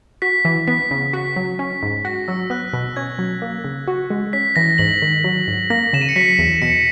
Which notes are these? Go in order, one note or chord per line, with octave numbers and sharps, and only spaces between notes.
F#4 B6
E3
B3 B6
C#3
F#4 B6
F#3
C#4
G#2
F#4 A#6
F#3 E6
B3 F#6
B2
C#4 G#6
F#3
A#3
C#3
F#4
G#3
C#4 B6
E3 A#6
G#2 F#7
D#3
F#3
G#2
A#3 A#6
C#3 E7
D#7
C#7
F#3 B6
E2
B2 C#7